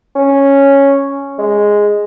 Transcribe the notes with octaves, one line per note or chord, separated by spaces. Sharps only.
C#4
G#3